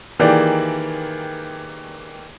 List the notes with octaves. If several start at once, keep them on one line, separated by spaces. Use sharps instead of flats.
D#3 E3 A#3 G4 G#4 D5